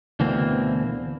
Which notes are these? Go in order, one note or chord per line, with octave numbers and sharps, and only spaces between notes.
D2 B2 E3 A#3 C4